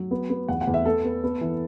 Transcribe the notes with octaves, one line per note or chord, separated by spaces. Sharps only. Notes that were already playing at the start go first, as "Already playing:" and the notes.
Already playing: F#3
B3
B3
E2 F#5
F#5
E2
E5
B3 A4
B3
B3
E3